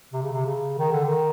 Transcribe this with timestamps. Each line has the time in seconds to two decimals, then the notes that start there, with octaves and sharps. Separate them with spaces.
0.13 C3
0.22 C#3
0.32 C3
0.45 C#3
0.78 D#3
0.92 D3
1.06 D#3